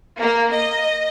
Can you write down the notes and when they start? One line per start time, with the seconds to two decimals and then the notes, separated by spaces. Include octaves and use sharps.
0.21 A#3
0.52 D#5